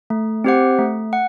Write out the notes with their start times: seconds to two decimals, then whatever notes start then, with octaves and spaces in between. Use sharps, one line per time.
0.10 A3
0.44 C4 G4 C5 F#5
0.79 A3
1.13 F#5